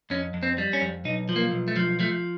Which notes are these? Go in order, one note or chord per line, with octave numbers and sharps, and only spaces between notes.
F2 C#4
F2
C4
G3
C#4
F2
B1 D#4
F3
A#3
B1
A3
F3
F3 A3